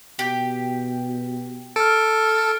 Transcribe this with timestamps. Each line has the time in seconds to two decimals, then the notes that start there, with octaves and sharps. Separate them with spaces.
0.19 B2 G4
1.76 A4 F6 D7